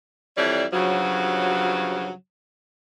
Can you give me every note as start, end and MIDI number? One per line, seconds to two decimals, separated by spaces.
0.37 0.64 41
0.37 0.64 52
0.37 0.64 55
0.37 0.64 64
0.37 0.64 73
0.37 0.64 74
0.72 2.11 43
0.72 2.11 49
0.72 2.11 53
0.72 2.11 54